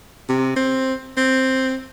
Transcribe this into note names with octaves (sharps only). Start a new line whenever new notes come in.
C3
C4
C4